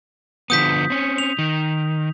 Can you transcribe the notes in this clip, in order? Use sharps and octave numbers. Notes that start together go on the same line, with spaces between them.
D3 F3 B3 D#6 G6 B6
C4 C#4
F7
D#3